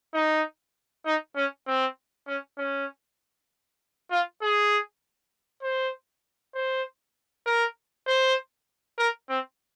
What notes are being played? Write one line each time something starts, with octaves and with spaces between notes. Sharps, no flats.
D#4
D#4
C#4
C4
C#4
C#4
F4
G#4
C5
C5
A#4
C5
A#4
C4